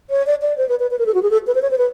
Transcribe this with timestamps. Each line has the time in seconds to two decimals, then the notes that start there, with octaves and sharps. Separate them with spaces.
0.10 C#5
0.27 D5
0.42 D5
0.58 C5
0.69 B4
0.79 B4
0.91 B4
0.99 A#4
1.06 A4
1.14 F#4
1.23 G#4
1.31 A4
1.47 B4
1.55 C5
1.62 C#5
1.71 C5
1.78 B4